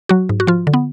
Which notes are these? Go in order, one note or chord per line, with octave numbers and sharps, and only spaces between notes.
F#3 F#4
G#2
F#4
F3 F4
D3
B3